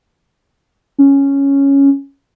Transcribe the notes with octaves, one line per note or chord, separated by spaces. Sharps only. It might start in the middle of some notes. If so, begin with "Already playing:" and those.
C#4